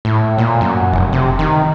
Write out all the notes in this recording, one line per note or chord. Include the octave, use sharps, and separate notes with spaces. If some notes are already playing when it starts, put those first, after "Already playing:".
A2
A#2
F#2
F1
C3
D#3